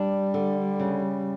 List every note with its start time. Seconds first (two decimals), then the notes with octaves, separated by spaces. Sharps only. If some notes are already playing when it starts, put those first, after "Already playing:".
Already playing: G3 D4
0.34 D3
0.80 C#3